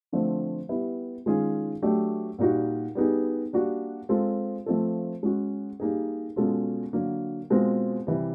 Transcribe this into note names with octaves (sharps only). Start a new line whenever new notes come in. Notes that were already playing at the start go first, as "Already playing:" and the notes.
D3 F3 A3 C4
G3 B3 E4
D#3 G#3 C#4 F4 G#4
F#3 A3 D4 G4
A#2 G3 A#3 D#4 F#4
G3 B3 D#4 G#4
G3 A#3 D4 F#4
G#3 C4 F4 A4
F3 A3 C4 F4 A4
G#3 C#4 F#4
G3 A#3 D#4 G#4
B2 G#3 C#4 F4 A4
D3 F#3 A#3
B2 G#3 C4 F4 A#4
C3 E3 G3